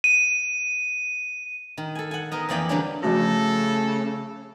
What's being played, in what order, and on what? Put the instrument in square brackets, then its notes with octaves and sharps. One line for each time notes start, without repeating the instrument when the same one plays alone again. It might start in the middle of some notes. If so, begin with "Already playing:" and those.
[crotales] D#7
[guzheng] D#3
A4 G#5
F#5 G#5
B3 D#4 A#4 D#5
F2 E3 A#3 D5 G5
D3 F#3 G3 A#3 C#4 D4
[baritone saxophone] C#3 [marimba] F3 F#4 [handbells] A3 A5 A#6 [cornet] A4